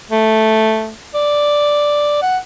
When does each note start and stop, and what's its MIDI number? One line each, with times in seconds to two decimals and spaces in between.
0.11 0.92 57
1.15 2.17 74
2.22 2.38 78